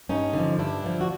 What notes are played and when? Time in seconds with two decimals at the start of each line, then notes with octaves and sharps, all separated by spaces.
0.09 G2 C#4 D#4
0.33 D3 F3
0.59 G2 D4 E4
0.83 D3 F3
1.01 F#4